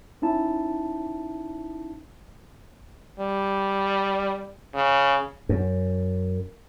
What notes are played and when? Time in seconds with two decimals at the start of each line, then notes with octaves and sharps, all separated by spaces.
0.22 C#4 D#4 E4 A5
3.19 G3
4.74 C#3
5.49 F#2